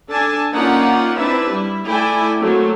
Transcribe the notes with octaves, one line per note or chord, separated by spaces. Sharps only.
D4 A4 G#5 A5
A#3 C#4 D#4 F4 D5 F#5
C4 D4 E4 B4 E5
G3 E4
A3 E4 A4 D5 G5 G#5
F#3 A3 A#3 C4